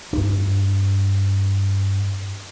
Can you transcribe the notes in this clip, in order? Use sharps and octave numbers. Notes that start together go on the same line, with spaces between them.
G2 D4